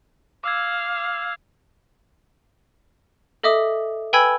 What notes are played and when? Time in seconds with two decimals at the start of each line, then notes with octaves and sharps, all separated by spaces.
0.44 F5 D6 E6 G#6
3.43 A4 D#5 E5 D6 D#6
4.13 B4 G5 G#5 B5 E6 G#6